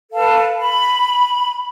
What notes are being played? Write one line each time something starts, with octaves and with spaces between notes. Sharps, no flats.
A4 B4 F5 A5
B5